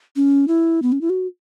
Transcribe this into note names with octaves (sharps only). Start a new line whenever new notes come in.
C#4
E4
B3
C#4
E4
F#4